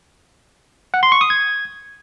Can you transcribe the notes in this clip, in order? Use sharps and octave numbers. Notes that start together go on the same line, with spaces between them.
F#5
C6
C#6
D#6
G#6